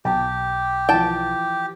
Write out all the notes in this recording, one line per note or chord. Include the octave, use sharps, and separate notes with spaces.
B1 G4 G5 A5
E3 F3 G5 A5